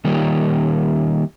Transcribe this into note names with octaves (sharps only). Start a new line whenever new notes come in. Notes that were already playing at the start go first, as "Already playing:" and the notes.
D#3 G3 A#3 D#4 G4 C#5